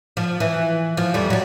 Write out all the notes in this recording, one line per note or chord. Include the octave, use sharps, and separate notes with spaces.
F3
E3
F3
F2 G3
F#3 G3